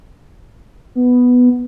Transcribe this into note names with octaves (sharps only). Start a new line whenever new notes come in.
B3